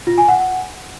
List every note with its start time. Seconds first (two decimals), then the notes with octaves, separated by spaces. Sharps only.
0.07 F4
0.18 G#5
0.28 F#5